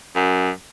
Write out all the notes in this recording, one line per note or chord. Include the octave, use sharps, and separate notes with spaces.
F#2